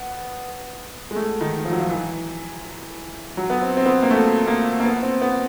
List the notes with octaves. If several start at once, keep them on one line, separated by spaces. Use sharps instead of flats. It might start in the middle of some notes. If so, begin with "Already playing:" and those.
Already playing: B3
G#3
A3
D#3
F3
F#3
F3
E3
F#3
B3
C4
C4
B3
A#3
A3
A#3
A#3
B3
C4
B3